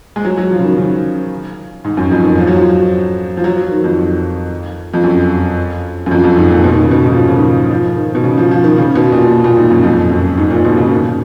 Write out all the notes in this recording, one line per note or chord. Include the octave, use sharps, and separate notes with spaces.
G#3
F#3
F#3
F3
C#3
D#3
C#3
G#2
F#2
F2
D#3
F3
F#3
F3
F3
F#3
F#3
D#3
F2
F2
F#2
F#2
F2
F2
G#2
A#2
B2
D#3
C#3
B2
G#2
F3
D#3
C#3
D#3
F3
F3
D#3
B2
C#3
F3
F3
D#3
C#3
B2
A#2
A#2
G#2
F#2
F2
F#2
G#2
A#2
B2
C#3
D#3